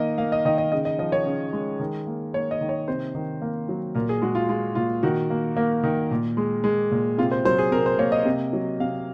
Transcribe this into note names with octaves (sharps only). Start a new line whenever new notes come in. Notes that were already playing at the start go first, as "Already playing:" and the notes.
Already playing: D#3 A#3 D#5
A#3 F5
D#5
D#3 D#5
D#5
C#3 D#5
D#5
F3 D#5
C#5
C#3
G#3
D#3
A#3
A#3 C#5
D#5
D#3
C#5
C3 C5
D#3
A#3
F#3
A#2 A#4
G#4
G#3 F#4
F4
G#3 F4
A#2 F4
D#3 F#4
A#3
A#3
D#3
A#2
G#3
G#3
A#2
C3 F4
C5
F#3 C5
G#4
C3 A#4
C5
A#3 C#5
D#5
C3
F#3
C3 F5